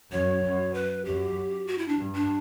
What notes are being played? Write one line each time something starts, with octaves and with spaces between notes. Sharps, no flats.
F#2 C#5
F#2
B4
F#2 G4
F#4
E4
D4
G2
D4